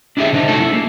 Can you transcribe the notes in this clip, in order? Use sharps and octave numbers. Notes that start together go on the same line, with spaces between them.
D4 E4 G4 G#4 E5
C3 D4 D#4
A3 F#4 G#4 A4
E4
A#3